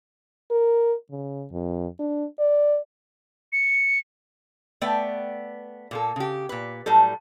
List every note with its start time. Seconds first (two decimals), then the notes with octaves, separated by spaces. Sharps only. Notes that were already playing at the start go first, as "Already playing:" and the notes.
0.51 A#4
1.11 C#3
1.51 F2
1.99 D4
2.39 D5
3.53 C#7
4.81 A3 B3 B4 D5 G5
5.91 A#2 A#3 A4
6.16 C#3 G4
6.49 A#2 B4
6.86 A2 F#3 G3 A4